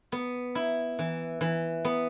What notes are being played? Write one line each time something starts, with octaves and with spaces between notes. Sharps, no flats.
B3
E4
E3
E3
B3